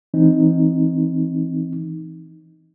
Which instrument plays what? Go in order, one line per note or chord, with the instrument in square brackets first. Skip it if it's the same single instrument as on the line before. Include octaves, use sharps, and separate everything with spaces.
[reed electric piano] E3 C4 D#4